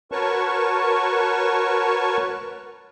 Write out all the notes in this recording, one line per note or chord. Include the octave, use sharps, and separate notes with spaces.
F#4 A#4 B4 C#5 A5 C#6